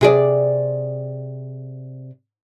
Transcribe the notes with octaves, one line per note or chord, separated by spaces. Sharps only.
C3 G#4 D5